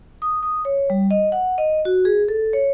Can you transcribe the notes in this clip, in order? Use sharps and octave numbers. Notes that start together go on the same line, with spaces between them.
D#6
D#6
C#5
G3
D#5
F#5
D#5
F#4
G#4
A4
C#5